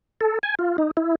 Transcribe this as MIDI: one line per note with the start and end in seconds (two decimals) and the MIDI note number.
0.21 0.39 69
0.43 0.55 80
0.59 0.77 65
0.78 0.91 63
0.97 1.15 64